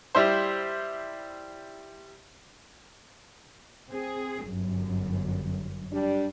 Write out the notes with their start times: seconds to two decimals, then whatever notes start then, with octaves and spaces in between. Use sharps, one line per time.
0.15 G3 E4 C5
3.90 C4 G#4
4.46 G1 F#2
5.92 G3 D4